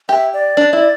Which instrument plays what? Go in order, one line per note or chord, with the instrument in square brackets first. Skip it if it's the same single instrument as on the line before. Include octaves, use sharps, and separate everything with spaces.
[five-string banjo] G4 [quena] E5
[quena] D5
[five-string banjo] D4
E4